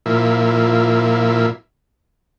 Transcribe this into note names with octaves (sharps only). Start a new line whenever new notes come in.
A#2 F3 E4